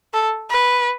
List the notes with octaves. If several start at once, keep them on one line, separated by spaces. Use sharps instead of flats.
A4
B4